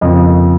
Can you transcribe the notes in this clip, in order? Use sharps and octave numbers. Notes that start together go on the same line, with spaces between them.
F2 C#3 A#3 D#5